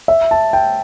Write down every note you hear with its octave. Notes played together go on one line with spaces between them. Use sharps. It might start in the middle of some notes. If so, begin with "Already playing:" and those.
E5
A5
G5